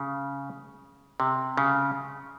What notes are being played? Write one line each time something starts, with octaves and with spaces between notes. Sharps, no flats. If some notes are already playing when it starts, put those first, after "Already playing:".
Already playing: C#3
C3
C#3